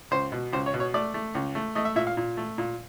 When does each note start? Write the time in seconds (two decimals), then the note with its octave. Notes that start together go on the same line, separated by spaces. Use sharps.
0.11 C#2 C5
0.32 B2
0.53 C#2 C5
0.66 C#5
0.74 B2
0.80 C#5
0.94 A3 D5
1.14 A3
1.35 C#2
1.55 A3
1.75 A3 D#5
1.85 E5
1.96 A#2 E5
2.07 F5
2.17 A#2
2.37 A3
2.58 A#2